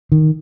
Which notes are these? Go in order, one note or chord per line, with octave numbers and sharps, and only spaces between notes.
D#3